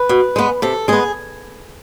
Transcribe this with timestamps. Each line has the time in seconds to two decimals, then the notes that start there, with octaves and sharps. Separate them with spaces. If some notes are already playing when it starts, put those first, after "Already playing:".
Already playing: B4
0.09 B2
0.36 G#3 B3
0.62 C3 A4
0.88 G#3 B3 G#4